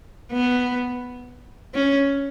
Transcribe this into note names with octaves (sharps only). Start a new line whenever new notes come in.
B3
C#4